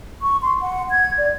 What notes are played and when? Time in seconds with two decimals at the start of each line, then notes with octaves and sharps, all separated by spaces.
0.22 C#6
0.42 C6
0.61 F#5
0.91 G#6
1.18 D5